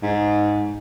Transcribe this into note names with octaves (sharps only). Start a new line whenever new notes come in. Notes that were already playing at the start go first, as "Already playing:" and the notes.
G#2